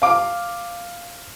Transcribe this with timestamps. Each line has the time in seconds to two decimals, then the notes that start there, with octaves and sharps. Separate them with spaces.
0.02 F5 D6